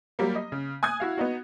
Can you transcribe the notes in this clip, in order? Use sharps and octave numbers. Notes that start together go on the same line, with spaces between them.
F#3 G3 A#3
D#5
C#3
G#5 D#6 F#6 G#6
E4 F#4 F5
B3 D#4 F#4